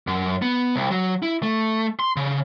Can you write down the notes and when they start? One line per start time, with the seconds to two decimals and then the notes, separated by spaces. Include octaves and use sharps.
0.07 F#2
0.42 B3
0.76 C2
0.91 F#3
1.23 E4
1.43 A3
2.00 C6
2.17 C#3